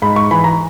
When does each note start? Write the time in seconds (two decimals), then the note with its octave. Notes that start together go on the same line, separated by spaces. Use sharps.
0.02 G#2 B5
0.16 C#6
0.31 E3 B5
0.44 A#5